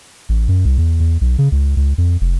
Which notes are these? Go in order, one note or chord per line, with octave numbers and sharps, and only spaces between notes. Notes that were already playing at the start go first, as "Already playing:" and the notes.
A1
F#2
C2
E2
E2
B1
C#3
C#2
C#2
F2
F1